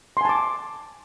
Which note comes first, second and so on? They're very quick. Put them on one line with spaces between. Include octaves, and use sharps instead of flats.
C6 G#5 A5 D6